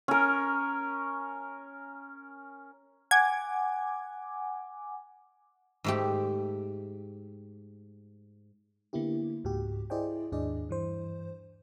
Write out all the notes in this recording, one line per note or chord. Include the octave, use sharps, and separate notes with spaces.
C#4 A#4
F#5 G#5 D6 G#6
G#2 A3 G4
D3 A#3 B3 E4 G4
C#2 G#2 F#4 G4
E4 G#4 C5 D5 D#5 G5
D#2 G#2 D4 G#4 D5 D#5
G2 E3 C5